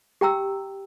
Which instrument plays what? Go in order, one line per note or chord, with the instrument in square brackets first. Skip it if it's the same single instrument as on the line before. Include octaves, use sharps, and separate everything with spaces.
[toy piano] G4 G5 A#5 E6